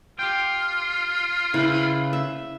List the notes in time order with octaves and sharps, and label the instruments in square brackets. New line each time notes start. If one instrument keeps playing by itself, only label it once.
[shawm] F4 [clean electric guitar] G4 G5
[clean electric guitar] C#3 B4 [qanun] E4
[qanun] E5